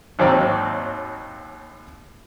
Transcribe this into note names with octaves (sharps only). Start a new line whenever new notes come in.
G#1 D#2 F#3 C4 D5